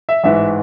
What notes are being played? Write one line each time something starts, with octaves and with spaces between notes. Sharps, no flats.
E5
A1 G#2 E3 E5